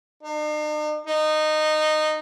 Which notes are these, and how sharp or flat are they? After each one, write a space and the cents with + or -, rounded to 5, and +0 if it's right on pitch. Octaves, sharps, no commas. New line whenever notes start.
D#4 -45
D#4 -15